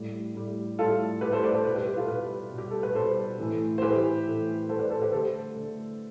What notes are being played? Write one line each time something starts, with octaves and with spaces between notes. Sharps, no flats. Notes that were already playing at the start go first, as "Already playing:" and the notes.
Already playing: A2 G3
A2 G3
A2 G3 F4 A4
A2 G3 G4 B4
A4 C5
B4 D5
A4 C5
B2 G3 G4 B4
G4 B4
G4 B4
F4 A4
B2 G3 G4 B4
B2 G3
G4
A4
B4
B2 G3 A4 C5
A2 E3 A3
C5
A2 E3 A3 G4 B4
A2 E3 A3
A2 E3 A3 A4 C5
B4 D5
A4 C5
G4 B4
D3 A3 A4 C5
D3 A3